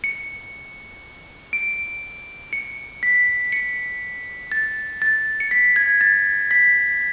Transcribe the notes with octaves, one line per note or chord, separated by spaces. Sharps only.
C#7
D7
C#7
B6
C#7
A6
A6
C#7
B6
G#6
A6
B6